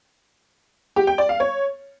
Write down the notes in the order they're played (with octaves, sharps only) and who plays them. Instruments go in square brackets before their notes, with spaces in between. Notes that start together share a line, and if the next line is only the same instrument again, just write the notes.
[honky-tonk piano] G4
G5
D5
F5
C#5